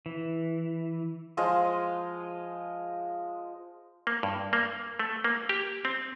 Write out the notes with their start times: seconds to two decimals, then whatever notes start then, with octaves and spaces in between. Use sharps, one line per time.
0.06 E3
1.37 F3 G#3 D#5 F5
4.07 A#3
4.23 G2
4.53 A#3
4.99 A3
5.24 A#3
5.49 G4
5.85 C4